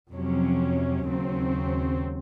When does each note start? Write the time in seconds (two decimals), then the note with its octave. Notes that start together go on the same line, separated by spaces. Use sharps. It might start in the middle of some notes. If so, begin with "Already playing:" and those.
0.12 F2 C3 F#3 C#4
1.07 D#2 C#3 F#3 C4